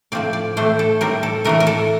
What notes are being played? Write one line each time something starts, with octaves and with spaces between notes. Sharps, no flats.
A2 F3 C4 D5
D5
A2 E3 A3 C4 C5
A4
A2 G3 C4 A#4
A4
A2 E3 A3 A#4
A#4
A4